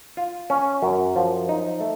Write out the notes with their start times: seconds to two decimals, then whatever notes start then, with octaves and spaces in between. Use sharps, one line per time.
0.17 F4
0.50 C#4
0.82 F#2
1.16 F3
1.49 D#4
1.81 A3